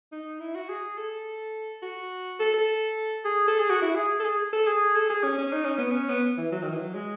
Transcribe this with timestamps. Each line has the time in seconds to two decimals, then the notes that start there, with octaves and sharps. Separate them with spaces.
0.12 D#4
0.40 E4
0.55 F#4
0.69 G#4
0.98 A4
1.83 F#4
2.40 A4
2.54 A4
3.25 G#4
3.48 A4
3.59 G#4
3.70 F#4
3.82 E4
3.96 G#4
4.20 A4
4.24 G#4
4.53 A4
4.67 G#4
4.96 A4
5.10 G#4
5.24 C#4
5.38 C#4
5.52 D#4
5.65 C#4
5.78 B3
5.91 C#4
6.09 B3
6.38 E3
6.52 F#3
6.62 D#3
6.71 E3
6.81 F#3
6.94 G#3